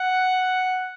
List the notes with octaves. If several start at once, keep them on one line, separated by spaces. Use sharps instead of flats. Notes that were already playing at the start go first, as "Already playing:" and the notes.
Already playing: F#5